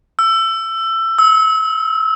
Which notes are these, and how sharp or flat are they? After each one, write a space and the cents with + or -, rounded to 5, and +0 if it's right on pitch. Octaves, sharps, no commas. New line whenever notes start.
E6 +20
E6 -35